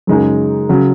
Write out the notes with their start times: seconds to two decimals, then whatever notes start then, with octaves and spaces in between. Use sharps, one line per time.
0.07 F#2 C#3 G#3 D#4 G#4
0.69 C#3 F#3